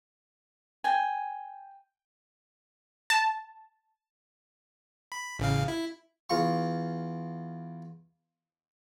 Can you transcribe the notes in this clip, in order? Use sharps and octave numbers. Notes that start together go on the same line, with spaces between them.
G5 G#5
A5
B5
A1 C#3 F5
E4
E2 F4 C#6